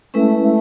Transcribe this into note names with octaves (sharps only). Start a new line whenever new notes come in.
G#3 A3 C#4 E4 B4
A3